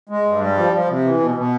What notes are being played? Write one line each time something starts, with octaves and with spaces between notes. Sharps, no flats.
G#3
G2
G3
F3
F3
C3
E3
B2
B2